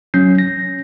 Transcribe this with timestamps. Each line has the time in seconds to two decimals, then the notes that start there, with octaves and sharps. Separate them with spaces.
0.14 F#3 C#4 G6 C7
0.38 A#6